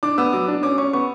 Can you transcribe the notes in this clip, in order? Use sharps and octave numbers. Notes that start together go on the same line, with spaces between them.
D4 D6
B3 E6
F#3 D6
D4
C#4 D6
C#4 C#6
B3 C#6